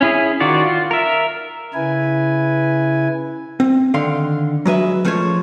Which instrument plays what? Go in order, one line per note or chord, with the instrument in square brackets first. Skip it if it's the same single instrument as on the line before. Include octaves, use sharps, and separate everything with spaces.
[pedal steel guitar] C#4 E4 G#4
D#3 F4 F#4 D5
F4
A#4 E5
[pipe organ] C#3 E4 B4 G#5
[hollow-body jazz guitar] C4
D3 D#3 F5 C6
F#3 G#3 B4 E5
F3 A3 C#4 G#4 C5 C#5